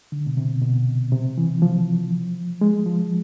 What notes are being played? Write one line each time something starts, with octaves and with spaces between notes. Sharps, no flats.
D3
B2
C3
B2
C3
E3
F3
G#3
F3